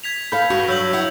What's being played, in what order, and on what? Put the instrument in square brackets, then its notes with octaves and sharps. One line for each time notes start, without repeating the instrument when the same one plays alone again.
[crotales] G#6 B6 F7
[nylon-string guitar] A4 F5 [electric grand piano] B5 G6
[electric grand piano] G2 [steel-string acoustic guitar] F#4
[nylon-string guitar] F#3 [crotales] E6 G6 F#7
[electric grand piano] E4 [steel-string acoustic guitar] F5 F#5